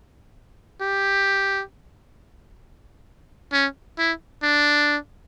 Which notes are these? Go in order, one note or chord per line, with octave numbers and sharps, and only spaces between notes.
G4
C#4
E4
D4